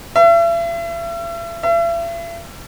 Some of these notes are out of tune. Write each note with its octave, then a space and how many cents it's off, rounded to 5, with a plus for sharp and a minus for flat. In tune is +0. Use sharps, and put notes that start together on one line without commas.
E5 +40
E5 +40